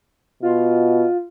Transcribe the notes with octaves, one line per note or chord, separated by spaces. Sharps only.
B2 F4